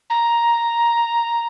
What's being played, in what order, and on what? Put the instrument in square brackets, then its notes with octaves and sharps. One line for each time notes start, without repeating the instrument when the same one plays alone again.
[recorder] A#5